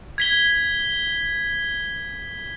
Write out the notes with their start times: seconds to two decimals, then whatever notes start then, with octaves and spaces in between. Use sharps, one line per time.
0.18 G#6 B6 G7